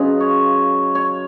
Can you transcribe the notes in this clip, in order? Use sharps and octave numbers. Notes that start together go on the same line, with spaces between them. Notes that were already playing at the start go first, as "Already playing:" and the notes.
Already playing: F#2 C#3 F4 G#4 B4 D#5 F5
C#5
C#5